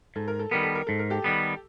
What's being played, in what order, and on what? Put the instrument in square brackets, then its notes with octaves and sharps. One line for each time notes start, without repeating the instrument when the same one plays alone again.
[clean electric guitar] G#2 [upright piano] A4
[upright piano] A#4
A4
[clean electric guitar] D#3 G3 B3 [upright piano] A#4
[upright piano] A4
A#4
[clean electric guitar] G#2 [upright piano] A4
[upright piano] A#4
G4 A4
[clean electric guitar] D#3 G3 B3